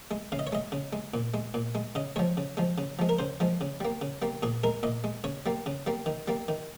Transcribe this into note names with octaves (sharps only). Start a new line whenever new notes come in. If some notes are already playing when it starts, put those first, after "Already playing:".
G#3
C#3 F5
D#5
C#5
G#3 D#5
C#3
G#3
A#2
G#3
A#2
G#3
C#3 D#5
F3 G#3 C#5
C#3
F3 G#3
C#3
F3 G#3
A#4
C#3 C5
F3 G#3
C#3
G3 A#3
C#3
G3 A#3
A#2 G#4
G#3 A#4
A#2 D#5
G#3
C#3 C#5
G3 A#3
C#3
G3 A#3
D#3
G3 A#3
D#3